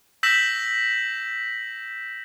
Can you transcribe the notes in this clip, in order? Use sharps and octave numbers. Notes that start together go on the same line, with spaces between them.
E6 G6 A#6 B6 E7 F#7